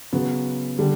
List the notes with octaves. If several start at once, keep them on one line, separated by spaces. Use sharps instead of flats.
C#3 F#3 B3
D3 G3